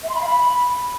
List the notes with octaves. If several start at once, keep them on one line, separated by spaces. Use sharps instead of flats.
E5
C6
B5
F5
B5